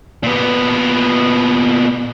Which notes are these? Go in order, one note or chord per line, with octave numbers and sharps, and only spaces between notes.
A#2 B3